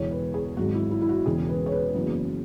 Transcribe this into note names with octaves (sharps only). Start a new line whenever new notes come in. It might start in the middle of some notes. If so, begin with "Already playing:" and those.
Already playing: E1 E2 E3 C#5
B4
G#4
G#1 G#2 F#3 F#4
E4
E4
E4
F#4
E1 E2 C#3 G#4
B4
C#5
B4
F#1 E2 C#3 F#3